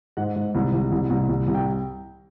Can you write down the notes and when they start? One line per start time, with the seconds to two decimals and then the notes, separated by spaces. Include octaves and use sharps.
0.17 G#2 F#5
0.36 G#2
0.55 C2
0.73 C2
0.92 C2
1.10 C2
1.29 C2
1.48 C2
1.55 G5